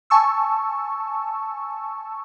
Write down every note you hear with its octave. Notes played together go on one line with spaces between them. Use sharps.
G#5 A5 C#6 E6